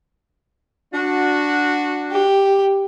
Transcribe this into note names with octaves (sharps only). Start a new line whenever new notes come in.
D4 F#4
G4